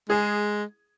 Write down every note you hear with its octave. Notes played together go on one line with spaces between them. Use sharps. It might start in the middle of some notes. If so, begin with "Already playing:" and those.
G#3 G#4